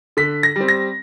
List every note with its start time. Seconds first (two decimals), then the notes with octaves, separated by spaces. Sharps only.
0.17 D3 B6
0.43 A#6
0.56 G3 C4
0.68 A#6